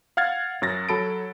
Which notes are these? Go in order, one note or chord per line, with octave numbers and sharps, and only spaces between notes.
F5 F#5 F6 G#6 A6
F#2 F#3 A6 A#6
F#3 A4 B5 D7